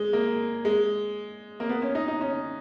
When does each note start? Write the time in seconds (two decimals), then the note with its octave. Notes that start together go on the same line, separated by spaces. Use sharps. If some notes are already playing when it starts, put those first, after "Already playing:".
Already playing: G#3
0.13 A#3
0.65 G#3
1.60 A#3
1.69 B3
1.82 C#4
1.95 D#4
2.08 D#4
2.21 C#4